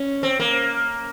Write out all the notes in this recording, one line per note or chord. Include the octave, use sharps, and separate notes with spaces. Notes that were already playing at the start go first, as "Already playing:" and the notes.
Already playing: C#4
C4
A#3